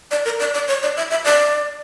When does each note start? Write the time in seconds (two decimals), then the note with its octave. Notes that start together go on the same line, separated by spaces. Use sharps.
0.11 D5
0.25 A#4
0.40 D5
0.54 D5
0.68 C#5
0.83 D5
0.97 E5
1.11 E5
1.25 D5